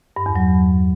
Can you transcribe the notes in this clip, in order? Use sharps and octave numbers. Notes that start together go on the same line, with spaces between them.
G2
E2
F#3